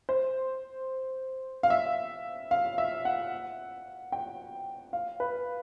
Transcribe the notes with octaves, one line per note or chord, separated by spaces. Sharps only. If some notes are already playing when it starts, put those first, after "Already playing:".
C5
F5
E5
F5
E5
F#5
G5
F5
B4